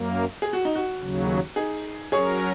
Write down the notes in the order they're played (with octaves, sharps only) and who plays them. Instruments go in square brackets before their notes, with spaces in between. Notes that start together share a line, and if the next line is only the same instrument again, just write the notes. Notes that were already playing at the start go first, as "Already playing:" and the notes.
Already playing: [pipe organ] F#2 A#3
[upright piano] G#4
F#4
D#4
F#4
[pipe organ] D#2 C#3 F#3
[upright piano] D#4 G#4
[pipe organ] F#3 C#4 A#4 [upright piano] G#4 C#5